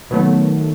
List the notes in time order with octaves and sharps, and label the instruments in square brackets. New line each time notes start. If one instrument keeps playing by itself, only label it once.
[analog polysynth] B2 F#3 A3 [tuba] D#3